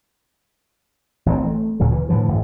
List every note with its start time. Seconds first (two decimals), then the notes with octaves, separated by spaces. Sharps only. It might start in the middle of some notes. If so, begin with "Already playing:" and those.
1.26 A1 E3 F#3 C4
1.47 A3
1.80 D2 A#2 C#3 F#3
1.92 E3
2.09 A2 D3 E3 F3
2.28 G#1 F#2